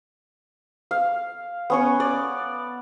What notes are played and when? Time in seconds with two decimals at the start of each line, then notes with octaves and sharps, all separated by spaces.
0.91 F5
1.70 B3 C#4 C#5
2.00 D5